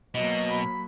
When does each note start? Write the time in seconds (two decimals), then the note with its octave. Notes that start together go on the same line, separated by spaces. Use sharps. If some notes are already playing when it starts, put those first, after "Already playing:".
0.15 B2 F#3 A#3 D#5
0.50 B5